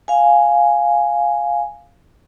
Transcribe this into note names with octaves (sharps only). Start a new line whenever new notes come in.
F5 G#5